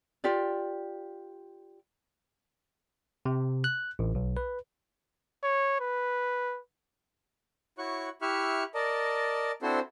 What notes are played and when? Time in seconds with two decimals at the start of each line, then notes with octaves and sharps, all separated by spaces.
0.24 F4 G4 D5
3.26 C3
3.64 F#6
3.99 A1
4.15 B1
4.37 B4
5.43 C#5
5.80 B4
7.78 E4 F#4 C#5 C#6 F#6
8.22 E4 G4 E5 C#6 F6 F#6
8.75 A#4 D5 D#5 A5
9.62 C4 D4 E4 F#4 A4 C5